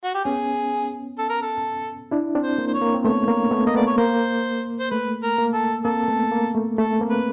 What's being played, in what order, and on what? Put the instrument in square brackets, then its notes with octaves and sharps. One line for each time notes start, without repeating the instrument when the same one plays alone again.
[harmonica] F#4
G4
[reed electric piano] B3 C#4 [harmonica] G#4
[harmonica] A4
A#4
A4
[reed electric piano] D4 E4
C4 D4
[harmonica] C5
[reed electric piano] A#3
[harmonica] C5
C#5
[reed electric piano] A#3
C4
[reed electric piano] A3 B3 [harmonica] C#5
[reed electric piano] A#3
A3 B3
[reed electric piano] A#3 [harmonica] D#5
[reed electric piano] A3 B3 [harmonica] D5
[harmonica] C#5
[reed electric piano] A#3 [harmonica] C5
[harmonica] C5
[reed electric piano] A3 [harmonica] B4
[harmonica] A#4
[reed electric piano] A#3
[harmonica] A4
[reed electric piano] A#3 C4 [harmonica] A4
[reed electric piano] A3 B3
A#3
A3
[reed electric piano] A3 [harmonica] A4
[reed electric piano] A#3 C4
[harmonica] B4